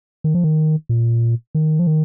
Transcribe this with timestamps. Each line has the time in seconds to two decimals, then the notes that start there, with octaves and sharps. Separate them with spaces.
0.24 D#3
0.35 F3
0.44 D#3
0.89 A#2
1.55 D#3
1.79 F3
1.87 D#3